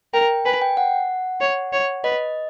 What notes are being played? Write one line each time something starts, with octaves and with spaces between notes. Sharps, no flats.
A#4 G5
B4 G#5
G5
F#5
C#5
C#5
B4 D#5